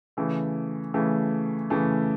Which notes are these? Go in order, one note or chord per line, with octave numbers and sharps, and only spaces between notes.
C#3 E3 A3
C#3 E3 A3
C#3 E3 A3